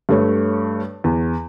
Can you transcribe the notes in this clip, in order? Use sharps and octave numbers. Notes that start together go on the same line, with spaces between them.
G2 A3 C#5
E2